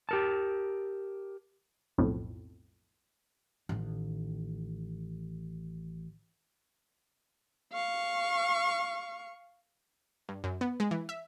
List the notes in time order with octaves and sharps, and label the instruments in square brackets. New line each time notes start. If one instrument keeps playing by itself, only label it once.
[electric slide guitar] G4 A#4 A5
[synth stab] B1 F2 A2
[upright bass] A1 D#3
[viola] F5 C#6
[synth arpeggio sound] G2
F#2
B3
G#3
E3
E5